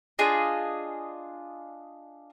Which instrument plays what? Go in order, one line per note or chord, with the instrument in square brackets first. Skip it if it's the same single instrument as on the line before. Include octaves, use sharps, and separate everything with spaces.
[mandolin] D4 F4 G#4 D#5